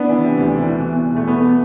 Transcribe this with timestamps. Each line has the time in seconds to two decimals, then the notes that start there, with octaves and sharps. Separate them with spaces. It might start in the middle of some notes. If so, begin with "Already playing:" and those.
Already playing: B3 D4
0.09 E3
0.24 C3
0.38 D2
0.54 E3
0.68 B2
0.83 B2
0.98 B2
1.13 E2 A3
1.28 B2 B3